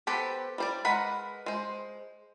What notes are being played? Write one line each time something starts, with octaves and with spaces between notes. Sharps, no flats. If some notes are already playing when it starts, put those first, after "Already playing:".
B3 G4 A4 B4 C5
G3 C5 D5
G#3 A#4 B4 F#5 B5
G#3 C5